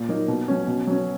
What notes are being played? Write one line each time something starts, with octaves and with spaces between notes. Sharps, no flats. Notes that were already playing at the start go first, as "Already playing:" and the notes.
Already playing: A#2
F#3 A#3 D#4
B2
F#3 C#4
B2
F#3 C#4